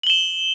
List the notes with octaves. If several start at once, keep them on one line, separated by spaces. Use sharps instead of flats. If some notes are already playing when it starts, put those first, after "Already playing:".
E7 F#7 G7